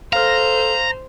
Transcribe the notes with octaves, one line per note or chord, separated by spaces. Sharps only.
A4 C5 F5 A#5 F6